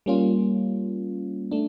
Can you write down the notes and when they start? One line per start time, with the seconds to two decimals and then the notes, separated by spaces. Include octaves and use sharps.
0.06 G3 A#3 C#4 F4
1.51 A3 D4